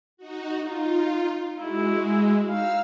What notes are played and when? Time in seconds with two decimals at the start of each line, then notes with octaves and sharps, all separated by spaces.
0.17 D#4 F#4
0.60 D#4 F4
1.59 G#3 E4 F#4
2.49 D#4 F5 E6 F6